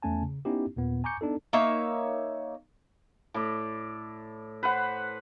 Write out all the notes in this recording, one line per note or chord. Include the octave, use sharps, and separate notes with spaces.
E2 A3 C#4 G#5 A5
C#3
B3 C#4 D#4 E4 G4
D#2 A#2 B3
G#5 A#5 C#6 D6 G6 C#7
B3 D4 D#4 A4
A#3 D#4 C#5 E5
A2 D5
B4 C5 F#5